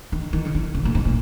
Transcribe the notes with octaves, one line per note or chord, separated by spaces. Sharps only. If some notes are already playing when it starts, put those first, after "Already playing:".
D#3
D#3
C#3
D#3
C#3
A#2
G#2
A#2